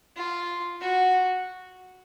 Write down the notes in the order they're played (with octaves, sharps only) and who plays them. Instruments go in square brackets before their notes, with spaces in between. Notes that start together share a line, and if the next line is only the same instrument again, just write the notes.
[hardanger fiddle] F4
F#4